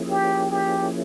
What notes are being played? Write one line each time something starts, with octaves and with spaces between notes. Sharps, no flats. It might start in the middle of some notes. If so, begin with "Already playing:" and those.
Already playing: F3 A#3 C#4 E4 G#4
G4
G4